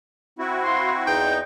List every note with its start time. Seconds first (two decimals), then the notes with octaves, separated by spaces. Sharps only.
0.39 C4 E4 F#4
0.64 F5 B5 C6
1.07 E2 D#4 G5